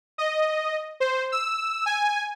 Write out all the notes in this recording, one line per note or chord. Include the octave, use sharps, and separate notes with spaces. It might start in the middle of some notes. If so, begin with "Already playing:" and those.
D#5
C5
E6
G#5